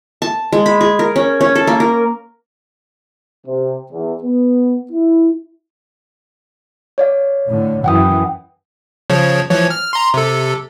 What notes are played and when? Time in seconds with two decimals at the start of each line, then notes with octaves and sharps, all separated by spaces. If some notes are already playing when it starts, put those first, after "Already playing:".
0.22 A5
0.53 G#3
0.66 B5
0.81 G#4
0.99 A#4
1.16 C#4
1.41 C#4
1.55 A4
1.67 A#3
1.80 A#4
3.46 C3
3.91 E2
4.22 B3
4.92 E4
6.98 C#5 D5 F5
7.49 A2 D3
7.84 F#2 E3 F#5 G5 D#6
9.10 C#3 F3 C#5
9.51 E3 F3 C#5
9.70 F6
9.93 A#5 C6
10.14 C3 A4